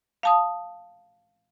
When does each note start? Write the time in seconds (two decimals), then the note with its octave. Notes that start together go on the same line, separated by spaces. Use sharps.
0.23 F5 A5 D#6